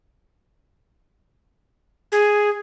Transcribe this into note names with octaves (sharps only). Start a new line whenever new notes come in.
G#4